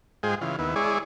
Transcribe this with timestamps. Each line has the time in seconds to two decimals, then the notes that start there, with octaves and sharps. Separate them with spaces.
0.23 G#2 G#3 F4 G#4 C5 G5
0.41 C#3 E3 F4
0.59 D#2 B3 E4
0.76 G#3 E4 G#4 C#5 D5